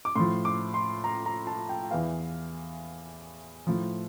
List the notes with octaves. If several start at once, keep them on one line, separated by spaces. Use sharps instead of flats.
D6
A2 F3 C6
D6
C6
A#5
A#5
A5
G5
E2 E3 F5
A2 F3